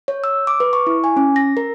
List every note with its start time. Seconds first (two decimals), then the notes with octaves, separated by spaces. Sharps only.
0.08 C#5
0.24 E6
0.47 D6
0.60 B4
0.73 C#6
0.87 E4
1.04 G#5
1.17 C#4
1.36 A#6
1.57 A#4